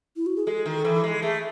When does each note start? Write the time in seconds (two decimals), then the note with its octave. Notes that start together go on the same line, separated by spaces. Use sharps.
0.16 E4
0.26 F#4
0.36 G#4
0.47 G#3 A4
0.66 D#3
0.84 E3
1.04 G#3
1.22 A3 G#4